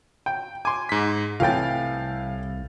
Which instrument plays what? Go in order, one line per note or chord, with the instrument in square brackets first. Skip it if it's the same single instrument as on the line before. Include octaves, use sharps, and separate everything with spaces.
[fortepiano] G5
[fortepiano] G#5 C6 [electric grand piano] D6
[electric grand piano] G#2 B6
[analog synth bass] C2 [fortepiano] A2 E3 G5 [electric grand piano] F5 A6